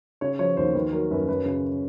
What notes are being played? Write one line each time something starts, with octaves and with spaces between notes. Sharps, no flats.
C#3 C#5
F3 C#5
D#2 C5
D#3 B4
F#3 A#4
F#2 B4
F#2 B4
C#3